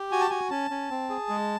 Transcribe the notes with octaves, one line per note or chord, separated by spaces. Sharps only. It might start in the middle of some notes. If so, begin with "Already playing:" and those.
Already playing: G4
F#4 G#5
A5
F#4 G#5
C#4 A5
C#4
C4
G#4
G#3